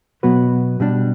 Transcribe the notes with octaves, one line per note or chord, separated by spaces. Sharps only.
B2 F#3 B3 F#4 B4
B2 G3 D4